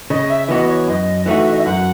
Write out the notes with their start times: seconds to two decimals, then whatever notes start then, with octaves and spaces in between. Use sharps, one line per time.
0.10 C#3 D#5
0.29 E5
0.48 E3 B3 F#4 D#5
0.68 C#5
0.87 F#2 D#5
1.26 E3 A3 D#4 F#4 E5
1.51 D#5
1.58 E5
1.65 F#2 F#5